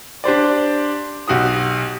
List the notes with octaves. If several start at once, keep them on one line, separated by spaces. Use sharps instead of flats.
D4 G4 C5 D5
B1 F#4 G4 D#6